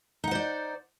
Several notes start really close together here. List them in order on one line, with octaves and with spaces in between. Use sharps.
D#4 F#5 C5 D5